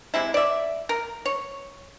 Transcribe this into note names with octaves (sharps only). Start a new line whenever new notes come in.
C3 G#3 E4
D5 E5
A#4
C#5